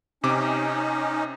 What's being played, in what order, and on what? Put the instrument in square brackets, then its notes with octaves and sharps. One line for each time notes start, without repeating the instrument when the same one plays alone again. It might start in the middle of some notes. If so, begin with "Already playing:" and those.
[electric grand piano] C3 D6 [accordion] C#4 D#4